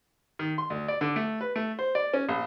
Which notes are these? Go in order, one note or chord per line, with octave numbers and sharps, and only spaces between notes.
D#3
C6
D2
D5
D3
A3
B4
A3
C5
D5
C#4
A#1